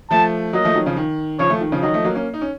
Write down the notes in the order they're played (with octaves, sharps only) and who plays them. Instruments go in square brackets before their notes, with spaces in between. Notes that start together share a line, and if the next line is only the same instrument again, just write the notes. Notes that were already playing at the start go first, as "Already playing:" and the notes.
[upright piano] F3 A3 [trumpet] A5
[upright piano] F#3 A#3 [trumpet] D#5
[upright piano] F3 A3
D#3 F#3
C#3 F3
D#3
[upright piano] C#3 F3 [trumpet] C#5
[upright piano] F3 A3
D#3
C#3 F3
[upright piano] D#3 F#3 [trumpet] D#5
[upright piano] F3 A3
F#3 A#3
A#3 C#4
D#4
C#4